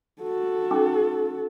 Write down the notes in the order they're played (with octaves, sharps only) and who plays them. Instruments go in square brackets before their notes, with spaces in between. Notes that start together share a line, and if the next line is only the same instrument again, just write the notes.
[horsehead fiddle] F#4 A4
[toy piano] C#4 D#4 D6